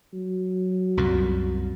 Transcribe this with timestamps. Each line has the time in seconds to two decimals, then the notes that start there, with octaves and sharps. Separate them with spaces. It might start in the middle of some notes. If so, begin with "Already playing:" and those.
0.13 F#3
0.97 C2 F#2 A#2